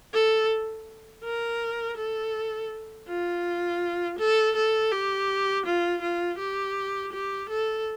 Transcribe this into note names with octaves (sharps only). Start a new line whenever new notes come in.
A4
A#4
A4
F4
A4
A4
G4
F4
F4
G4
G4
A4